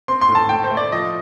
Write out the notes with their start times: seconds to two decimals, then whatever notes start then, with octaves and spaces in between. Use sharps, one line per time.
0.08 C4 C6
0.21 C6
0.29 A2
0.35 A5
0.49 A2 G5
0.64 C5
0.70 A3
0.77 D5
0.92 F3 D#5